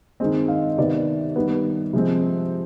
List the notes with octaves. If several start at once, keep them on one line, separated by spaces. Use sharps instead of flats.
D#3 G#3 C4 D#5
F5
C3 D#3 B3 D5
D#3 G3 B3
C3 F3 G#3 C4